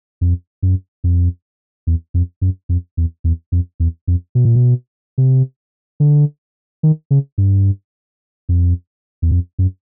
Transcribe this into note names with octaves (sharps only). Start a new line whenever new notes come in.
F2
F#2
F2
E2
F2
F#2
F2
E2
E2
F2
E2
F2
B2
A#2
B2
C3
D3
D#3
C#3
G2
F2
E2
F2
F#2